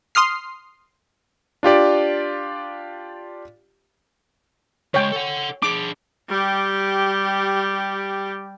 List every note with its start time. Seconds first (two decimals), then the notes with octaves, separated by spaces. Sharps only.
0.15 C6 D#6 F6 C7
1.63 D4 F4 G4 D5
4.94 C#3 G#3 C#5 G5
5.12 A4 F#5
5.63 D4 G#4 D6
6.29 G3 G4